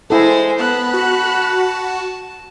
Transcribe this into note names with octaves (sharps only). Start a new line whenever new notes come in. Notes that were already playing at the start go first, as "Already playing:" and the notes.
G#3 E4 A4 C5 G#5
B3 A5 B5 F#6
F#4